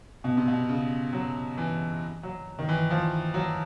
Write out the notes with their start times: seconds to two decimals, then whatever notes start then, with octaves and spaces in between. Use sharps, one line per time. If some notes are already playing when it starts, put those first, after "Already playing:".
0.24 B2
0.37 C3
0.48 B2
0.69 C#3
1.13 F#3
1.58 E3
2.23 F#3
2.59 D#3
2.69 E3
2.90 F3
3.34 F#3